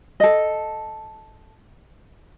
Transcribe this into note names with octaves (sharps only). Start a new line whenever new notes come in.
A4 D#5